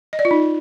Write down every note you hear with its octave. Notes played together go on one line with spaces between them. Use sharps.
D#5
D5
F4
D#4